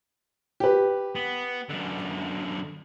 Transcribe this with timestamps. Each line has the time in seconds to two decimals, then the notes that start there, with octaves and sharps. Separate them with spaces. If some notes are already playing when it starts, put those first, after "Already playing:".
0.60 G4 B4
1.15 B3
1.69 F#2 D3